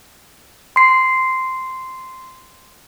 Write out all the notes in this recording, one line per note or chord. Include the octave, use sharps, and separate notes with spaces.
C6 C7